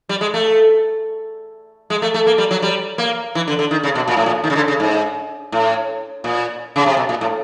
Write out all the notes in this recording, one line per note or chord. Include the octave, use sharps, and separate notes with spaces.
G3
G#3
A3
G#3
A3
A3
A#3
G3
F#3
G3
A#3
E3
D3
D3
D#3
C#3
B2
A#2
A2
A#2
D#3
C#3
D3
C#3
G#2
A2
A#2
C#3
C3
B2
A#2
A2